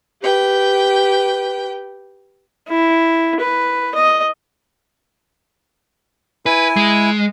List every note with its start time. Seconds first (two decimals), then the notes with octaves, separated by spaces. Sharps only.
0.21 G4 B4 G5
2.68 E4
3.40 B4
3.95 D#5
6.46 E4 B4 G#5
6.76 G#3